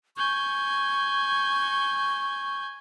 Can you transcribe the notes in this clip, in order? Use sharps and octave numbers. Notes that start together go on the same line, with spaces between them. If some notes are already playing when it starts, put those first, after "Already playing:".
G#5 C#6 G6